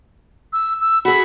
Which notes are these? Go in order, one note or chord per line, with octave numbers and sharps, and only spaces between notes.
E6
E6
F#4 G#4 B5